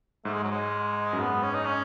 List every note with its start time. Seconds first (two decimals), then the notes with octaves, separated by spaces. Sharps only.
0.25 G#2 A3
0.33 G#3
0.43 F#3
0.51 G#3
1.13 F#2
1.19 G#2 B3
1.43 C#4
1.54 D#4
1.65 C#4